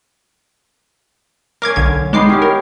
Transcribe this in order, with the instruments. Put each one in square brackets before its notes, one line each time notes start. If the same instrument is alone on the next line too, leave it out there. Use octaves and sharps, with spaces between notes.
[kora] C#4 F5 [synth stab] A#4 D6 G#6
[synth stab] B1 D3 G#6
[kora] D#3 B3 [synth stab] G#3 D6 C7
[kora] E3 C#4 G4
[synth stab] A#4